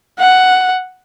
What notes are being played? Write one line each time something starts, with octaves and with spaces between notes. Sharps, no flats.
F#5